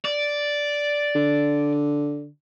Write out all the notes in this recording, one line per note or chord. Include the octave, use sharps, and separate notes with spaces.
D5
D3